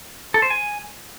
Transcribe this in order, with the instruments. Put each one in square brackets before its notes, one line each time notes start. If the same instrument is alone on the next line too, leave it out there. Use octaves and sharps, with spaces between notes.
[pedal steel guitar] A4
C5
G#5